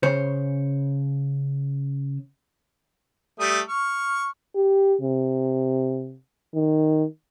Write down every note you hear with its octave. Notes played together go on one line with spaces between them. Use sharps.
C#3 C5 C#5
G3 A3 D#6
C#6 F6
G4
C3
D#3